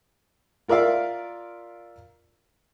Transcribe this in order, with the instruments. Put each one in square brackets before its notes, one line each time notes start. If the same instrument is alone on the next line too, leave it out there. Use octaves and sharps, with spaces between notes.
[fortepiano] F4 A#4 D5 E5 F5